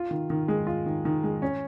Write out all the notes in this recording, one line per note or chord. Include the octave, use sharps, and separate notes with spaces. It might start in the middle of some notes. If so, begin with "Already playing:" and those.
Already playing: F4
D#3
D#3
G#3
F4
D#3
D#3
G#3
C#4